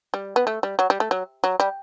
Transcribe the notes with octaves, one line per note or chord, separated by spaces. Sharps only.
G3
B3
A3
G3
F#3
G3
A3
F#3
F#3
G3